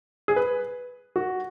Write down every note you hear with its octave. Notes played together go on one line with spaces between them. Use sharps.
G#4
B4
F#4